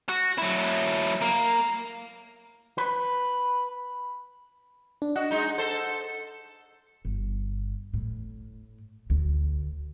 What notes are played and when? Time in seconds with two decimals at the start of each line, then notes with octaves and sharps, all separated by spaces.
0.09 F#4
0.38 F#3 E4
1.21 A#3
2.78 B4
5.02 D4
5.16 F#4 D#5 F#5
5.31 G#3 D#4
5.58 A4 C5
7.05 G1
7.94 A2
9.10 D2